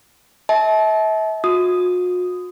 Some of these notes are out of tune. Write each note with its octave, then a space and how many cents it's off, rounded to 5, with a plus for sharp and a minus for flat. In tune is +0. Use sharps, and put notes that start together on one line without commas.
E5 -40 A5 -35
F#4 -45 D#6 +0